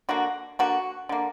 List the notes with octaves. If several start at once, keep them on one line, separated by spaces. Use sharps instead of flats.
D3 A#3 F#4
D3 A#3 F#4
D3 A#3